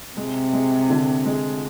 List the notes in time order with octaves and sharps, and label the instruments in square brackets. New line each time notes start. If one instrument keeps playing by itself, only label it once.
[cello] C3 [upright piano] G#3
[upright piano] G#3
D3
G#3